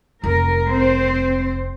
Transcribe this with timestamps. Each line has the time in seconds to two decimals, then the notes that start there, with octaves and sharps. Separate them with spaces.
0.24 F1 A#4
0.69 C4 C5